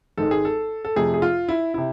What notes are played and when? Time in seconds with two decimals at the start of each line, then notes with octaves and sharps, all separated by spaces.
0.18 G#1 G#2 G#3 A4
0.31 G#4
0.45 A4
0.85 A4
0.96 F2 C3 F3 A3 G#4
1.14 G#4
1.22 F4
1.49 E4
1.74 C3 E4